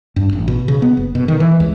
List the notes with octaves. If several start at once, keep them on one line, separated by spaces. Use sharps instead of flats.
G2
A1
B2
C#3
B3
F#1
B2
D#3
E3
C#2